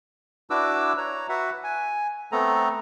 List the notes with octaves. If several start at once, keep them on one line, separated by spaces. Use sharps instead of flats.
D4 E4 F#4 B4 D6 E6
C#5 A#5
F#4 B4 E5 F#5
G#5
A3 B3 C4 A4 A#5